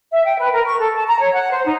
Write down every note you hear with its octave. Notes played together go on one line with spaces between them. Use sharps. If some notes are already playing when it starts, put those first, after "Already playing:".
E5
G5
B4
A#4
C#6
A4
A5
A#5
C#5
F#5
C5
D#4